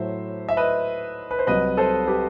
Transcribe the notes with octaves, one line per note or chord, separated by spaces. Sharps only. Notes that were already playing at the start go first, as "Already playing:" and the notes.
Already playing: A2 F#3 A3 C5 E5
E5
B4 D#5
B4
C5
C2 C3 F#3 B4 D#5
A4 C5
G4 B4